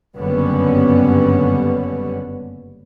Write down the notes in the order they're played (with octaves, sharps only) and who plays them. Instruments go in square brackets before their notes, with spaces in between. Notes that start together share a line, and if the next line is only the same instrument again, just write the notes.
[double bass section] F#1 G2 D3 G3 B3 C#4